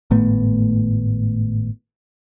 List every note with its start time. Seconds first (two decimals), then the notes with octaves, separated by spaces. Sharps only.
0.11 G#1 A2 A3 B3